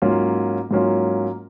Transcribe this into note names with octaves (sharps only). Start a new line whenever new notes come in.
G#2 F#3 A#3 C#4 F4
G#2 F#3 A#3 C#4 F4